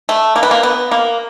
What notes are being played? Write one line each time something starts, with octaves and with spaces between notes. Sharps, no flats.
A3
A#3
B3
A#3
B3
A#3